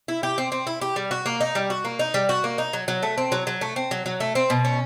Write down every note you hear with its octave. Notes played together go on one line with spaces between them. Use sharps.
E4
G4
C4
C4
E4
G4
G3
F#4
A#3
D#4
G3
F#4
A#3
D#4
G3
F#4
A#3
D#4
F#3
F#3
A3
C4
F#3
F#3
A3
C4
F#3
F#3
A3
C4
B2
C#4